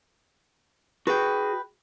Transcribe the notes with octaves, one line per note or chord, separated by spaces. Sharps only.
F#4 G#4 B4 G5